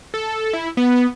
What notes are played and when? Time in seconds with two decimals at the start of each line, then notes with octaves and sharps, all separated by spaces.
0.14 A4
0.53 E4
0.77 B3